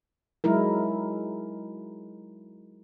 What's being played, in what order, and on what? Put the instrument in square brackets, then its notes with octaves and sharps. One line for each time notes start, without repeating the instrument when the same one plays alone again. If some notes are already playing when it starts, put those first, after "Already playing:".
[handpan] F#3 G#3 D#4 E4 A#4